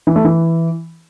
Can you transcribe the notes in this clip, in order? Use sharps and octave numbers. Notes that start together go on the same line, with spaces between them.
E3
A3
E3